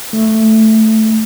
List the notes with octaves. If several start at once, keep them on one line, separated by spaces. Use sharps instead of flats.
A3